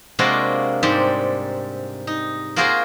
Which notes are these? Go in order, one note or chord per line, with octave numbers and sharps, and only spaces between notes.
C3 G#3 A#3 D4 F4 F#4
G#2 G3 C4 G4
D#4
A#3 F4 F#4 G#4 A#4 C5